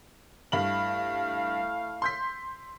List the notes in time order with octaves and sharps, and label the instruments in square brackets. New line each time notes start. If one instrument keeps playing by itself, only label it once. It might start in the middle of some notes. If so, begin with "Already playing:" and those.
[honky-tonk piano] G2 B5 F#7 [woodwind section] A3 E4 F5
[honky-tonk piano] C6 G6 B6